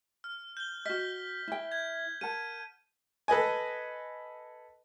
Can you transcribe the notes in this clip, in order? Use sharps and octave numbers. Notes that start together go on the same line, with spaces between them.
F6
G6 G7
F#4 D#5 F6 B6
E4 G5
G#6
A#4 F#5 A5 D#7
A4 B4 D#5 G#5